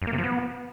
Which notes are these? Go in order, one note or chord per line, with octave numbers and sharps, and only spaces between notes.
F#2
A#3
C3
F3
B3